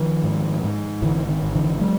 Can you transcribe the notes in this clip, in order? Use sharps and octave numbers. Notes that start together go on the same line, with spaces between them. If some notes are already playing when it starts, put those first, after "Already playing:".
Already playing: D#3 F3
G#2
G#2
G#1 D3 E3
D#3
G#1
D3 E3
F#3 G#3